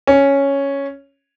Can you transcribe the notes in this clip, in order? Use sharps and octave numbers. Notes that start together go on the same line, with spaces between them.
C#4